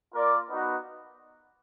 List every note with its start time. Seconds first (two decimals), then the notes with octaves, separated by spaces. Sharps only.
0.14 A#3 F4 A#4 D5
0.49 B3 D#4 F#4